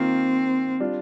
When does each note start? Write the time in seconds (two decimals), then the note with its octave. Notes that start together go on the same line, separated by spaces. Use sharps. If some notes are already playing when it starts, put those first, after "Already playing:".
Already playing: D#3 A#3 C4 F4
0.80 G3 D4 F4